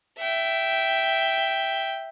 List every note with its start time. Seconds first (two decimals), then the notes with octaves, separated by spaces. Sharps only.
0.19 E5 G5